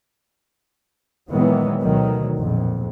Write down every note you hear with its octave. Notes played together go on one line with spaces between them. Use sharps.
A#2 D#3 E3 F#3 G#3 B3
D2 B2 D#3 F#3
A#1 F2